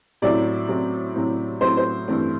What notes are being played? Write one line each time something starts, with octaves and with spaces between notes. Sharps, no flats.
A2 F#3 C4 E4 D5
A2 F#3 C4 E4
A2 F#3 C4 E4
A2 F#3 C4 E4 C5
C5
G2 E3 A3 C4 E4